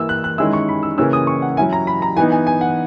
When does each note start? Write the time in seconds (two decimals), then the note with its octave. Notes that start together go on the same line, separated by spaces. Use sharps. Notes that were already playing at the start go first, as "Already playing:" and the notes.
Already playing: E3 A#3 E4 E6
0.09 F#6
0.24 F#6
0.38 D#3 G#3 C#4 E4 E6
0.53 C#6
0.69 B5
0.83 E6
0.98 C#3 E3 A#3 C#4 E6
1.13 D#6
1.27 C#6
1.42 F#5
1.57 F#3 C#4 E4 G#5
1.73 A#5
1.87 B5
2.02 A#5
2.17 E3 B3 D#4 G#5
2.32 G#5
2.47 G#5
2.61 F#5